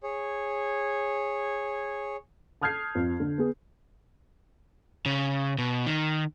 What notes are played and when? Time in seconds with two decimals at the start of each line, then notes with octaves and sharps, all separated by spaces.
0.03 G#4 C#5
2.61 A5 D#6 F6 G6 G#6 C7
2.95 F2
3.20 D3
3.38 B3 G#4
5.06 C#3
5.58 B2
5.86 D#3